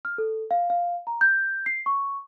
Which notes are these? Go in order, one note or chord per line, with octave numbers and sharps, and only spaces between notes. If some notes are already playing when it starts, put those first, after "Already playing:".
F6
A4
F5
F5
A#5
G6
C7
C#6